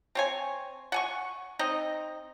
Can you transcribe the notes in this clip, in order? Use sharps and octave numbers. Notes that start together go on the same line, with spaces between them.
C4 C#5 G#5
F#5 G#5 C#6
C4 D#4 D#5